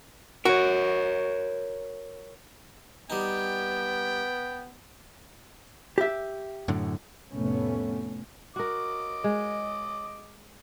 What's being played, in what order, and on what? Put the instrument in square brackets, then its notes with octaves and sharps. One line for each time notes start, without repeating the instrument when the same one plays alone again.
[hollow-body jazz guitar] F#4 [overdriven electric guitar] A#4 C#5
[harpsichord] G3 D#4 [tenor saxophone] B3 [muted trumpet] G5
[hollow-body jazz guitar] G4 E5
[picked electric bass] F#2 A2 D3
[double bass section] F1 A2 A3 B3 C#4
[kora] F#4 A#4 [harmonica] D#5 D6
[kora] G#3